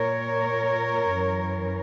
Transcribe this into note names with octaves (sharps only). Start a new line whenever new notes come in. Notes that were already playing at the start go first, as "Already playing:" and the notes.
Already playing: A#2 A#4 C#5
F#2 E3